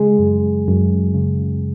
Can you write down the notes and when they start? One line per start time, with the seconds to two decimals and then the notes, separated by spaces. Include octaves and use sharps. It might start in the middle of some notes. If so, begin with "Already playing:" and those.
Already playing: C#3 G#3 G#4
0.19 F#2
0.67 F#2
1.14 C#3